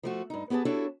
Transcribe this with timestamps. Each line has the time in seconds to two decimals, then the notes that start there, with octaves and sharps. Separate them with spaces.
0.03 F3 A3 F#4
0.30 G2 D#4
0.50 B3 G4 G#4 B4 A5
0.65 D4 E4 F#4 G4 A4 C#5